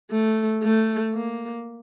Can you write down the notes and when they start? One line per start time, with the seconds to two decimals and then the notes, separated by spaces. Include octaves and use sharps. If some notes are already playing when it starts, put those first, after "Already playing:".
0.11 A3
0.63 A3
1.14 A#3